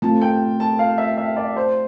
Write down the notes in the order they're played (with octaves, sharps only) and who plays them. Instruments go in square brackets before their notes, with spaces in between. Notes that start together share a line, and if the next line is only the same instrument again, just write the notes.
[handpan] A3 C4 F4 [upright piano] A5
[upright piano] G5
A5
F5
E5
E5
D5
C5